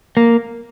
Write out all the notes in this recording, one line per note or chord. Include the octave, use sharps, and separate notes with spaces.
A#3